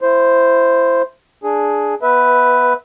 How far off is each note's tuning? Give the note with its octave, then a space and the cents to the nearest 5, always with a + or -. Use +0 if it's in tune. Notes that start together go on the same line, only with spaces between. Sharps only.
E4 +25 C5 +0
D4 +0 G#4 +5
B3 -15 B4 +5 E5 -20